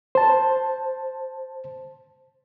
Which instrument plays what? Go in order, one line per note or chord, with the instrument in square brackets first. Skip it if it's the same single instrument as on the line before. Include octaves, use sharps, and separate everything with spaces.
[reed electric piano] C5 A5